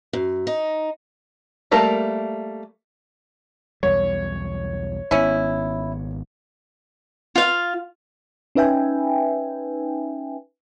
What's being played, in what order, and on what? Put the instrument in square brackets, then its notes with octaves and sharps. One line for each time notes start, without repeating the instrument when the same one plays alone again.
[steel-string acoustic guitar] F#2
D#4
[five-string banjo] G3 A3 A#3 A#4
[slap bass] B1 E2 G3 [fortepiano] C#5
[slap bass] G#1 B3 [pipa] C#4 E4
[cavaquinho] F4 F5
[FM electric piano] C#4 D#4 B4 E5 G5 G#5